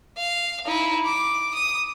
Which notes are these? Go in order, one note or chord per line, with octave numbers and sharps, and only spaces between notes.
F5
D#4 E4
D6
D#6